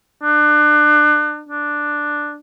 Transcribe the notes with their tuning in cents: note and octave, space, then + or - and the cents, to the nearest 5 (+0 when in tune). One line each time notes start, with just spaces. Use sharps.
D4 +30
D4 +5